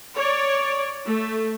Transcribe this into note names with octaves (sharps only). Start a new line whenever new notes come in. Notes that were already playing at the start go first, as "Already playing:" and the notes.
C#5 D5
A3